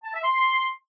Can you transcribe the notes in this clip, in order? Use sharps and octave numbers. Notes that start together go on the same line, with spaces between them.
A5
E5
C6